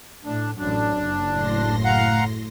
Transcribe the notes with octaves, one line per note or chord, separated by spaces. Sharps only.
A2 D4
A1 F#2 D4
F#1
A2 C6 A#6
F5 F#5 A#5